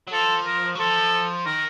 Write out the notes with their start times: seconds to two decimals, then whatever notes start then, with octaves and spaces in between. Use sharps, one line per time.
0.08 F#3
0.12 F3 A4
0.46 A#4
0.75 F#3
0.79 F3 A4
1.46 D#3 A#4